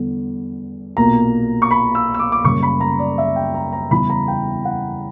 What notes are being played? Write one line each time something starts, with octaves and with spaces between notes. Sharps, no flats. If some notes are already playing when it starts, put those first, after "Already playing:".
Already playing: E2 D3 G3
B1 A#2 A#3 A#5
C#6
B5
E6
E6
D6
D6
F#2 C#3 G3 A#3 C#4 C#6
B5
A#5
D5
E5
G5
A#5
A#5
E2 C#3 E3 G3 B5
A#5
G5
F#5